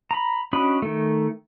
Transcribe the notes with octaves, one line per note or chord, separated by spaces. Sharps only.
A#5 B5
C#4 D4 F#4 D#5 B5
D#3 A3